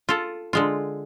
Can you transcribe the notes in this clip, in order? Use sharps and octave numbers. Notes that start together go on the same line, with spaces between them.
F4 A4
D3 G#3 F4